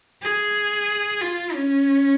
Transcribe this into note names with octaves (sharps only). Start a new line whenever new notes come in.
G#4
F4
C#4